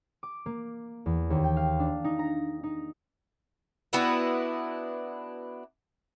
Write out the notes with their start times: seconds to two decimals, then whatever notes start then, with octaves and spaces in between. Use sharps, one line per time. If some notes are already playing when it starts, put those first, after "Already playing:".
0.23 D6
0.46 A#3
1.06 E2
1.30 D#2
1.44 G5
1.57 F5
1.80 D4
2.04 D#4
2.19 A#5
2.64 D#4
3.93 B3 D4 E4 F#4